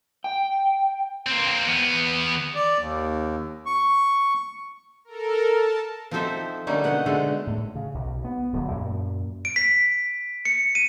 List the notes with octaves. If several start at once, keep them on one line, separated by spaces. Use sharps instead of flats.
G5
A#3 C4
E2 B3
D5
D#2
C#6
A4 A#4
A5
F3 C4 D#4 A4 C5 E5
D3 G3 A3 A#3 C#4 D#4
B2 D#5 F#5 G#5
B2 D3 G#3 A3 A4
A2
C#3
B1
B3
D1 G2 F#3
F#2 A#2
D7
B6
C#7
D#7